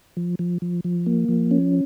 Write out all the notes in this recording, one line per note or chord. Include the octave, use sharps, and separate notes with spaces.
F3
F3
F3
F3
A#3
F3
C#4